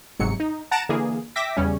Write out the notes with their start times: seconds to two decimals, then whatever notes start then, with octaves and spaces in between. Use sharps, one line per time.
0.19 G1 F2 G#2 C3 F#3 C#7
0.40 D#4
0.71 F#5 A5 A#5 D7 E7
0.89 D3 E3 A#3 G#4
1.36 E5 G5 D6 A#6 B6
1.57 E2 C#3 G3 C#4